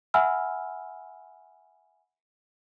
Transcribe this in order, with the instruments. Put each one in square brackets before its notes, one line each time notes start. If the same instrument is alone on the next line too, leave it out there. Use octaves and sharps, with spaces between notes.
[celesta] E5 F#5 G#5 B5 E6 F6